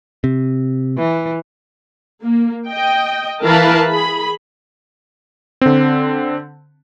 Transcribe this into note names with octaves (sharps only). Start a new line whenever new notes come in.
C3
E3
A#3
D#5 G5
E3 A#4 B4 F5 A5 B5
G#4 B5
D3 C4